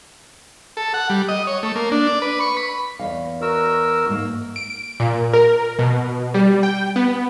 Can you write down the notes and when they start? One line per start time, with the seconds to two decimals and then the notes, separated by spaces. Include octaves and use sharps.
0.77 A4
0.94 F#5
1.10 G3
1.28 D#5
1.47 C#5
1.63 A3
1.75 A#3
1.91 D4
2.07 D5
2.22 B4
2.40 C#6
2.57 B5
2.99 E2 D#5 F5
3.42 F#4 A#4 E6
4.08 G#2 A#3
4.56 D7
5.00 A#2
5.34 A#4
5.79 B2
6.34 G3
6.63 G5
6.96 B3